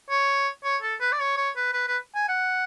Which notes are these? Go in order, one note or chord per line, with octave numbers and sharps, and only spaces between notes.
C#5
C#5
A4
B4
D5
C#5
C#5
B4
B4
B4
G#5
F#5